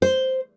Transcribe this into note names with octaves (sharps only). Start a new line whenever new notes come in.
C5